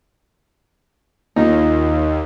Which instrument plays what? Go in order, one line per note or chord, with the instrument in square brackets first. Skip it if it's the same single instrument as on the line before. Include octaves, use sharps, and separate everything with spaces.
[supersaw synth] D#2 [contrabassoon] A#2 [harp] D#4